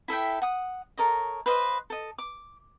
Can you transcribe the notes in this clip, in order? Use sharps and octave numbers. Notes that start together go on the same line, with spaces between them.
E4 A4 E5 G5
F#5 D#6
A4 A#4 C#5 D#5
B4 C5 D#5 F5
A4 D#5
D6